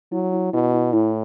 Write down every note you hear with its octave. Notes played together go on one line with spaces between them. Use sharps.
F#3 E4
E4
B2 E4
E4
A2 E4